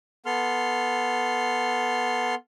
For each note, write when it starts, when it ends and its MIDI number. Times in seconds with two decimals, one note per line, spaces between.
0.26 2.35 59
0.26 2.35 69
0.26 2.35 84
0.26 2.35 89